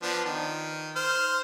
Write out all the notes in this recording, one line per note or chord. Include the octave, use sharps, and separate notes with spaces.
F3 B3 D4
D#3
C5 F6